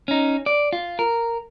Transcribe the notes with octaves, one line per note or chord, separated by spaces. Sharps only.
C#4 D#4
D5
F4
A#4